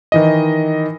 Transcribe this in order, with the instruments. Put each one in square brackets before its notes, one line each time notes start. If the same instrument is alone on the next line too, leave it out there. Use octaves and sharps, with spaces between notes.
[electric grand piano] D#3 E3 D#5